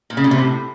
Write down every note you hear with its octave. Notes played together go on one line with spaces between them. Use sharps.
A#2
C#3
A#2
C3
A2